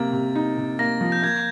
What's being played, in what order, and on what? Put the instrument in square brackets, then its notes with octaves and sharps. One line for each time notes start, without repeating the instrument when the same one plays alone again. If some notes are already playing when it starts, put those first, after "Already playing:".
Already playing: [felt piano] C3 A#3 [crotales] A6
[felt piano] C3
D#4
C3
[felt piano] A#3 [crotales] A#6
[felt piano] F3
[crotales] G6
[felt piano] A#3 [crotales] G#6